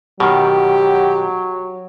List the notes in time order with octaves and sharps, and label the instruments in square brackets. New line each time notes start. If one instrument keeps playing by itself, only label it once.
[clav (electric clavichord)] B2 D#3 [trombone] F#3 [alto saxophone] G4